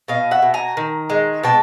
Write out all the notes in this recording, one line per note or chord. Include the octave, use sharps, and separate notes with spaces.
B2 D#5 F5
E5 F#5
B2
G#5 A#5
D#3
G#3
B2 G5 A5